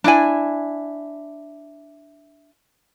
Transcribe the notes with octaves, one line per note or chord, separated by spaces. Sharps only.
D4 E4 G#5